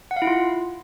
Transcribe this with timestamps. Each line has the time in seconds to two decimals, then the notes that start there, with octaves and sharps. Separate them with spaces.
0.11 F#5
0.16 F5
0.22 E4
0.27 F4